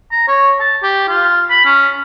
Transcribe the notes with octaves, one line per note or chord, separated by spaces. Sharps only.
A#5
C#5
A5
G4
F4
B5
C#4